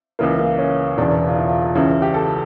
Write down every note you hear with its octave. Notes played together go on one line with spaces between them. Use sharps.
C#2 C#3 E3 A#3
A#3
C#4
E1 E2 C#3 E3 D4
F4
E4
F4
F4
C#2 C#3 E3 E4
G4
A4